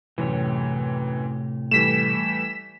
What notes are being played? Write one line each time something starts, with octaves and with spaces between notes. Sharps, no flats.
F#2 A2 C3 E3 C#5
E3 G3 A3 B6 E7